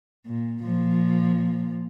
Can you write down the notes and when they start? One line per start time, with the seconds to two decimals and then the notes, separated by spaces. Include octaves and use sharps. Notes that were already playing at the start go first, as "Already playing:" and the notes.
0.27 A#2
0.65 A#2 F3